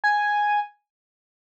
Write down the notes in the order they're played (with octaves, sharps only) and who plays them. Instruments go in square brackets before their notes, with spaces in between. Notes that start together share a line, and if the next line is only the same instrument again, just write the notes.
[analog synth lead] G#5